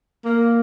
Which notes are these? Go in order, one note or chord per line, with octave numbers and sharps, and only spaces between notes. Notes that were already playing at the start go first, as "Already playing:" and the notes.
A#3